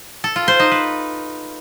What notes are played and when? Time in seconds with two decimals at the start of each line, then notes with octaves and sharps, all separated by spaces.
0.24 A4
0.36 F4
0.48 C5
0.60 D#4
0.72 B4